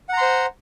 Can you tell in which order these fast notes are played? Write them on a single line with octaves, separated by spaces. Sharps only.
F#5 A#5 C6 C5